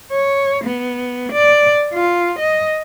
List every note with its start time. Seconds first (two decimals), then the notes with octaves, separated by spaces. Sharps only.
0.12 C#5
0.65 B3
1.32 D5
1.93 F4
2.39 D#5